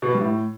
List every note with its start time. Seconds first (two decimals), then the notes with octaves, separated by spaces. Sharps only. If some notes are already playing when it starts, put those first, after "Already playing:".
0.02 B2
0.08 B3
0.15 G3
0.21 A2